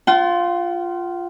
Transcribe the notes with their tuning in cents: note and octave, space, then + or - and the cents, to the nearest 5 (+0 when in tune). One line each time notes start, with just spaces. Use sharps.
F4 +0 F#5 +45